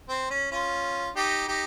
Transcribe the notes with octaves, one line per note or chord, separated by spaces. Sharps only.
C4
C#4
C#4 F4
D#4 G4
D#4 G4